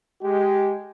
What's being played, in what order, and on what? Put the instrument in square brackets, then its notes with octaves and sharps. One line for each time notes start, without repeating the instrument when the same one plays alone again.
[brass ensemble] G#3 G4